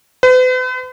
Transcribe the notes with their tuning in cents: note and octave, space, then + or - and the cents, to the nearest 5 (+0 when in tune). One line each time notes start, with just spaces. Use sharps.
B4 +45